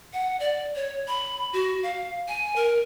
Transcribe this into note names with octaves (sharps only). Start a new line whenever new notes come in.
F#5
D5
C#5
B5
F#4
F5
G#5
A#4